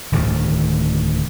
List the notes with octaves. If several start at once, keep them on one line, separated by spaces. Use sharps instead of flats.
D1 D2 D#3 A3